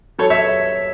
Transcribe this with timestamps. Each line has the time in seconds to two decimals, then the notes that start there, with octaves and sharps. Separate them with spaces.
0.19 F#3 A4 C#5
0.30 C#5 E5